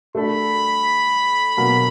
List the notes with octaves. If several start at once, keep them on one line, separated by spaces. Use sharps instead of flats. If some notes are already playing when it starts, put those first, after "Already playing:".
A3 D4 F#4 A4 B5
B2 F#3 A#3